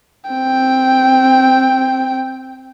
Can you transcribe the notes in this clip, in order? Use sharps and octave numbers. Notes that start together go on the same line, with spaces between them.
C4 G5